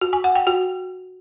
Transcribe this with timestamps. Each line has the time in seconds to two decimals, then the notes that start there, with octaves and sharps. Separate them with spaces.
0.01 F#4
0.13 G#5
0.24 F#5
0.35 G5
0.47 F#4